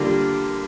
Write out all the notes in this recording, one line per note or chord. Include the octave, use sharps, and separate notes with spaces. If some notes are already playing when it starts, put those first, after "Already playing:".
Already playing: D3 G3 A#3 F4